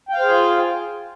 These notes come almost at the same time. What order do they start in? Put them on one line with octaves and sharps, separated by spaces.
G5 F5 C5 G#4 F4